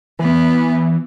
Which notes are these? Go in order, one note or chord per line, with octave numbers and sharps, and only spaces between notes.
E3 B3